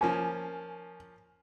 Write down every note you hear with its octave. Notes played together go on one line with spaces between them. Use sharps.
F3 A#3 C#4 G#5